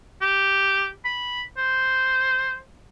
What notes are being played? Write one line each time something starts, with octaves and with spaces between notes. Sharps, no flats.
G4
B5
C5